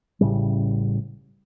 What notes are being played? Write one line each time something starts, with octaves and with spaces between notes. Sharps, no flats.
A1 A2 C#3 G3